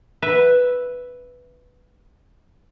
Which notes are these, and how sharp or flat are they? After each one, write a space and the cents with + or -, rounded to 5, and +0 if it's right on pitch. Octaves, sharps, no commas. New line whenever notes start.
B4 +0 E5 +0